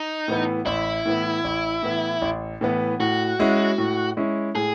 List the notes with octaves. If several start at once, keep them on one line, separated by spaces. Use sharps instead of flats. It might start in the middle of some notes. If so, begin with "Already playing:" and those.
Already playing: D#4
A2 E3 B3
A1 E4
A2 E3 B3
A1
A2 E3 B3
A1
A2 E3 B3
A2 F#4
G#3 C#4 E4
A2
G#3 C#4 E4
A2 G#4